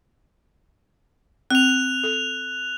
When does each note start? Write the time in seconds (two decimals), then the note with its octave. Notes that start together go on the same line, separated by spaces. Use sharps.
1.50 C4 F#6 F7
2.04 A4